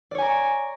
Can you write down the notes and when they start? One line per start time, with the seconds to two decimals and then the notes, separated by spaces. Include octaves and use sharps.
0.11 D5
0.15 C#5
0.18 G#5
0.22 A#5